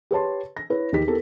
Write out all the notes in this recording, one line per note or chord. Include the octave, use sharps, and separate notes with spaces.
G4 B4 C#5 A5 C6
A#6
E4 B4 C#5
D#2 D#4 G4 B6
B3 E4 G4 A4 A#4